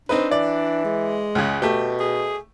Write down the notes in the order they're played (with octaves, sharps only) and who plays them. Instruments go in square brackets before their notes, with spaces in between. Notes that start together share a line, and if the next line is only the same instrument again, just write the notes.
[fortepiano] C4 D#4 B4 [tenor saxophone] D4
[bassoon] E3 [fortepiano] D5
[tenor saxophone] G#3
[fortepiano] C#2 C#3
[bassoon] B2 [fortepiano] A3 G4
[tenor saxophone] G#4